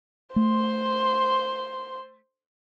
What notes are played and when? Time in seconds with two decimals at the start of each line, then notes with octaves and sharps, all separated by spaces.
0.36 A3 C5 C6